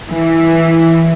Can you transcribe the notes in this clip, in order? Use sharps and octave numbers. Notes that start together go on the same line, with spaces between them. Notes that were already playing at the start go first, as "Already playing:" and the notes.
E3